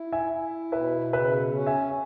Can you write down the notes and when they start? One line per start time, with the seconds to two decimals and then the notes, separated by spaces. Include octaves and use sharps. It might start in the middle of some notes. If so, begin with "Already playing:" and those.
Already playing: E4
0.12 E5 G#5
0.32 E4
0.72 B2 B4 E5
1.13 C#3 B4 E5
1.53 C#4
1.67 E5 G#5